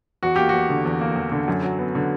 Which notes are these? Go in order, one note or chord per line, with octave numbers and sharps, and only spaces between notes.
E2 F#4
A#3 G4
F#4
E2
D3
E2
A#3
E2
D3
F#2
F#3
B3
D3